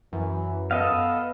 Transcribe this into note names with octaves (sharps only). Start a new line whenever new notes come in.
F#2 E3
B3 A4 D#5 F5